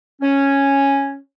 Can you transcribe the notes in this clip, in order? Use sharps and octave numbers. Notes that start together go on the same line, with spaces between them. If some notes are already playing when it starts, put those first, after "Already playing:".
C#4